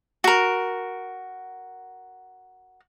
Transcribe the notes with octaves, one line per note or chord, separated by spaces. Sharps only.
F#4 A#4